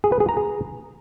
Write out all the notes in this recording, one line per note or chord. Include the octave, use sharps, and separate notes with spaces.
G#4
B4
G#4
A#5
G#4